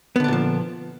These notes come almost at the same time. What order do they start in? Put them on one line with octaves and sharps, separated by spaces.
B3 D3 D4 A#2 F3